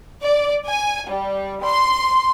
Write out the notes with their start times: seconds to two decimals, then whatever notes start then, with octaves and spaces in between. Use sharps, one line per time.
0.22 D5
0.67 G#5
1.09 G3
1.63 C6